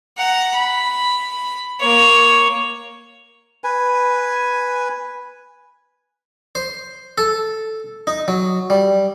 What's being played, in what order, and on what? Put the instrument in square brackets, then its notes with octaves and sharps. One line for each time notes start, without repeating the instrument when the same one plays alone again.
[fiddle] F#5 A#5
B5
A#3 C#5
[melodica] B4 G#5
[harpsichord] C5
A4
D#4
F#3
G3